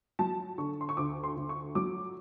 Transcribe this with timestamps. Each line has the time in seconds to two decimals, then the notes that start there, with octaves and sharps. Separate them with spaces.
0.19 F#3 A5
0.58 D3 C#6
0.81 C6
0.89 C#6
0.97 D2 D6
1.24 C6
1.36 D2
1.49 C#6
1.75 F#3 D6